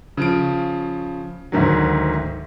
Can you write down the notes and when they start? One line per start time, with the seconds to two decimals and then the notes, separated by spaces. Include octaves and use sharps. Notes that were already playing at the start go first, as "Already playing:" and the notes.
0.17 C#3 F3 D7
1.52 D2 G#2 D#3 F#3